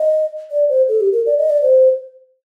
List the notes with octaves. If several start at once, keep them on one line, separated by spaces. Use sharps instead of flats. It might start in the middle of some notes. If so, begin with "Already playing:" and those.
Already playing: D#5
D5
C5
A4
G4
A#4
D5
D#5
D5
C5